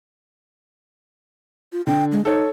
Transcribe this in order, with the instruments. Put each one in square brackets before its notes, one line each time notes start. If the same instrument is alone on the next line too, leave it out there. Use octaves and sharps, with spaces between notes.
[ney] F4
[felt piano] D3 [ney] G5
[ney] G#3
[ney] D#4 [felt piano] A4 C#5